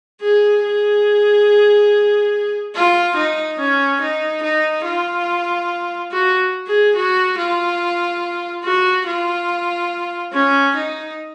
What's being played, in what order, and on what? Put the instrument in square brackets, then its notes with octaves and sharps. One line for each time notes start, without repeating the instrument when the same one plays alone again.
[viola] G#4
G#4
F4
D#4
C#4
D#4
D#4
F4
F#4
G#4
F#4
F4
F#4
F4
C#4
D#4